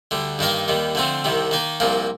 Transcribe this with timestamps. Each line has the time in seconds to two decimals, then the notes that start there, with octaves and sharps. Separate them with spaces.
0.11 D2 D3 G3
0.39 G2 D#3 A#3 D#4 A#4
0.68 D#2 D#3 G3
0.95 D3 F3 A3 C4
1.24 C2 C3 D#3 G3
1.51 D#3 A#3 D#4
1.80 C2 A#2 F3 A#3